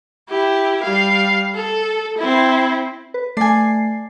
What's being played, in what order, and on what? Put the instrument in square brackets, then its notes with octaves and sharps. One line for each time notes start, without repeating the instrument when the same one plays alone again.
[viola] E4 G4
G3 F5
A4
C4 E4
[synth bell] B4
[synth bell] A3 C7 [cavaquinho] D5 G#5